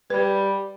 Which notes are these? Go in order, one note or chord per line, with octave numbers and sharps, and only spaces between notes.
G3 B4